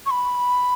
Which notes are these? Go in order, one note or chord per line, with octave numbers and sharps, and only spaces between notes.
C#6
B5